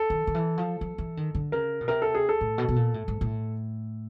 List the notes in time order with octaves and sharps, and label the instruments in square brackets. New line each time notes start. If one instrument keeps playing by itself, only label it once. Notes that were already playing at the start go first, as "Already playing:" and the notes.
Already playing: [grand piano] A4
[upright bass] D#3
D#3
E3
F3
F3
E3
D#3
D3
[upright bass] C#3 [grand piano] A#4
[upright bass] B2
[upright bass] C3 [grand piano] A#4
[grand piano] A4
G#4
A4
[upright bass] A2
B2
B2
A#2
A2
G#2
A2